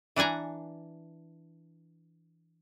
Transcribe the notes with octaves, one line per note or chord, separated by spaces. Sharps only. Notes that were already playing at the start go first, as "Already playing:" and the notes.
E3 D4 F#5 G#5 A#5